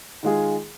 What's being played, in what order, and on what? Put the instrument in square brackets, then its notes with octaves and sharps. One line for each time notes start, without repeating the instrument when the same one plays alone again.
[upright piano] D#3 G#3 F4 G#4